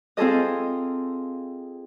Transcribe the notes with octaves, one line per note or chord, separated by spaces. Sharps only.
C4 F4 G#4 A4 D#5